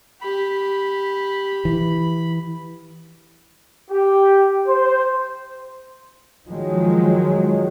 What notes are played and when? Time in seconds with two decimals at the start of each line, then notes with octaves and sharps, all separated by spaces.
0.21 G4 B5
1.65 E3
3.91 G4
4.67 C5
6.47 D#3 F3 F#3 G#3